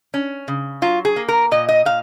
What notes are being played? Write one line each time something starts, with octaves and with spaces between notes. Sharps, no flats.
C#4
C#3
F#3 F4
G#4
A#3
A#4
A#2 D#5
D#5
A#2 F5